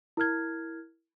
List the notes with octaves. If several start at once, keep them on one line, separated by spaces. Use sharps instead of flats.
E4 A#4 F6 G#6